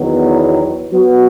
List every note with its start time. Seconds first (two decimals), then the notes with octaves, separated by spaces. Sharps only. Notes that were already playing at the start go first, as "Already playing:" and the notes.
Already playing: E2 D#3 F#3 B3
0.92 F#3 B3 F#4 B4